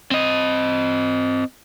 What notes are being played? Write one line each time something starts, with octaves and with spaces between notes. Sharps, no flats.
C4 D#5